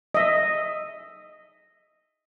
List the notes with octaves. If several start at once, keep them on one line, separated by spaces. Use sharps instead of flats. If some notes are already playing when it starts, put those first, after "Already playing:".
D#5 E5